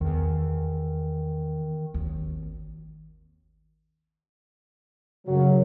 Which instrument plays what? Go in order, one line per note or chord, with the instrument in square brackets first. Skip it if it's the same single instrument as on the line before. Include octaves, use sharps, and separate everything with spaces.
[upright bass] E2 [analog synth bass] D#3
[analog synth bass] G#1 [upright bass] D#2
[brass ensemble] F#2 F#3 [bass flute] C#3